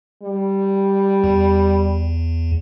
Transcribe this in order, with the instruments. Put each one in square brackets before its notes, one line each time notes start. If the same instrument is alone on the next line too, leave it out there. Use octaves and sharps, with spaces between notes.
[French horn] G3
[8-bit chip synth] E2